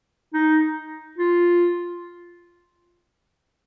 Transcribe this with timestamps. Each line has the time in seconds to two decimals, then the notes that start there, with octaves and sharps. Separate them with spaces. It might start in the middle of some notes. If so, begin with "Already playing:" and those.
0.34 D#4
1.18 F4